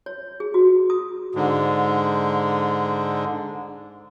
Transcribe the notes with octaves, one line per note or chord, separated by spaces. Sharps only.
C#5
G#4
F#4
D#6
G#2 D3